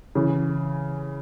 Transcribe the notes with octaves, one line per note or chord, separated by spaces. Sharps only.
C#3 E3